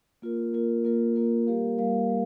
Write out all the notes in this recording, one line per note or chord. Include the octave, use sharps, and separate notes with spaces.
A#3 F4 A#4
A#3 F4 A#4
A#3 F4 A#4
A#3 F4 A#4
G3 A#3 G4 A#4 F5
G3 A#3 G4 A#4 F5
G3